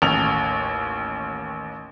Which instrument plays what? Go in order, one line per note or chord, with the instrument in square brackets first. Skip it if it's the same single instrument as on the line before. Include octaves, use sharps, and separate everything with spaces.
[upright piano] A1 D#2 F7